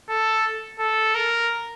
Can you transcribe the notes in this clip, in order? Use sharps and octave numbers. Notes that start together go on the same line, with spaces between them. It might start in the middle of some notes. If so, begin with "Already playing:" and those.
A4
A4
A#4